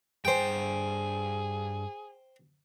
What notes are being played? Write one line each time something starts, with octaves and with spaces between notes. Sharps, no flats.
G2 G#4 C5 G5 G#5